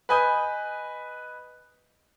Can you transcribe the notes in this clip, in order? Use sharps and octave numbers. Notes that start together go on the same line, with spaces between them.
B4 D#5 G#5 B5 D#6 G6